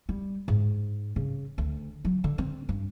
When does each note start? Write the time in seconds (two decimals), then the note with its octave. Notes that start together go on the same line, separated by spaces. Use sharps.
0.09 G3
0.48 G#2
1.16 C#3
1.58 D2
2.05 F#3
2.24 D3
2.38 C4
2.69 G2